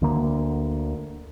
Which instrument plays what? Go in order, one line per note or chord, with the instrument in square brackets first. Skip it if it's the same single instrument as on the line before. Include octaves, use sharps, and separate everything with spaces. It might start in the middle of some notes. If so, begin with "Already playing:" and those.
[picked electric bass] D2 D3 A#3